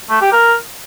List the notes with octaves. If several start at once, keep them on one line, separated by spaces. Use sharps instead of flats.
A3
G4
A#4